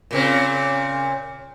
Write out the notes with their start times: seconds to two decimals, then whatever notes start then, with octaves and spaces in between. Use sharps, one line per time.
0.11 A#2 C#3 C4